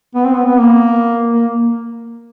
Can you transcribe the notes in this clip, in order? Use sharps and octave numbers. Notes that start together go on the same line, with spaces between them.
B3
C4
B3
B3
A#3
A#3